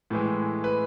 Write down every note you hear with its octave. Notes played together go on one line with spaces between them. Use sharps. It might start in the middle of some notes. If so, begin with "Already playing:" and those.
A2 E3 G#3
B4